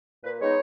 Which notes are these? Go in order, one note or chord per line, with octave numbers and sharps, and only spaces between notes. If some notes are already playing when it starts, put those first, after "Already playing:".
A#2 B4
G#3 B3 D#4 C#5